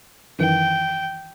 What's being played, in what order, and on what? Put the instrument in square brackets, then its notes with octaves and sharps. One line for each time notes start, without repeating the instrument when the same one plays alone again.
[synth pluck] F#2 D#3 E3 [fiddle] G5